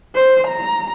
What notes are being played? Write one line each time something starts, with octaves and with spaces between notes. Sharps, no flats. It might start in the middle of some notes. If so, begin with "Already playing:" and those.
C5
A#5